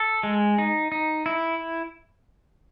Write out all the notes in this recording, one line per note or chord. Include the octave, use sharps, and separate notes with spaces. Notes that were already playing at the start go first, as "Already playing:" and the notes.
Already playing: A4
G#3
D#4
D#4
E4